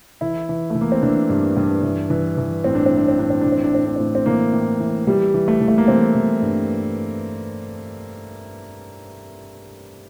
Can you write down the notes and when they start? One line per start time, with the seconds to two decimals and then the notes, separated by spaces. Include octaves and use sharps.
0.21 E3 E4
0.49 E3
0.70 E3 A3
0.81 A#3
0.92 C4
1.03 E3 D4
1.30 G2
1.56 G2
1.83 E3
2.10 E3
2.38 E3
2.64 A2 C4
2.75 D4
2.86 C4
2.91 E3
2.97 D4
3.08 C4
3.18 A2 D4
3.30 C4
3.41 E3 D4
3.52 C4
3.64 D4
3.72 A2 C4
3.86 D4
3.96 A2 C4
4.15 C4
4.26 E3 A#3
4.53 A2
4.80 E3
5.07 E3 G3
5.34 E3
5.48 A3
5.61 E3
5.68 A3
5.78 A#3
5.88 E3 C4
6.15 E3
6.42 G2